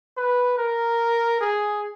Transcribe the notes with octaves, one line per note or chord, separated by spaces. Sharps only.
B4
A#4
G#4